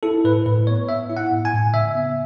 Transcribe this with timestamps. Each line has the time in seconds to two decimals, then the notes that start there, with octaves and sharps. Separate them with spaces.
0.03 E4 A4
0.24 A2 B4
0.46 A2 B4
0.67 B3 C#5
0.88 B3 E5
1.10 E4
1.17 F#5
1.31 A2
1.45 G#5
1.53 A2
1.74 C#3 E5
1.95 B3